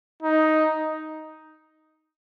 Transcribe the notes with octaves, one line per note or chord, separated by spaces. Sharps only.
D#4